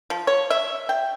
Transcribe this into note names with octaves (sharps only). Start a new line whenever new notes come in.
F3
C#5
E5
G5